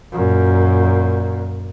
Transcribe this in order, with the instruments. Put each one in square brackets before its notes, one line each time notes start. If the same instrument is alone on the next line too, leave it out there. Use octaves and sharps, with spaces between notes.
[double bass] F#2 A#2